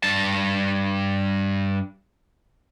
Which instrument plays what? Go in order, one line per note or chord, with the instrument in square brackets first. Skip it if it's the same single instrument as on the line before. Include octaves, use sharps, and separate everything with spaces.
[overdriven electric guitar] G2 A5